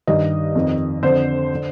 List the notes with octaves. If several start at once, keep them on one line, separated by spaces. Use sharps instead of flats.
G2 D#3 D#5
F2 D#3
F2 D3 C5
D3